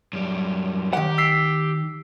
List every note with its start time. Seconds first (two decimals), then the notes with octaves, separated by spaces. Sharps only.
0.13 F#2 G3
0.93 D#3 G4 F#5
1.18 E6 B6 C7